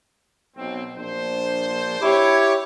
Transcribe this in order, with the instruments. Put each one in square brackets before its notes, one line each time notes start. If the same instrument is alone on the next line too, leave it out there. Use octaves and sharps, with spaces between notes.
[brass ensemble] B1 C4
A#1 D4 C5
[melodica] E4 D6 [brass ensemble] G4 C#5